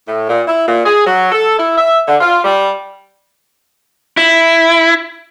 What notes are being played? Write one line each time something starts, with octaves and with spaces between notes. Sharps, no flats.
A2
A#2
E4
A#2
G#4
F#3
A4
E4
E5
D3
F4
G3
E4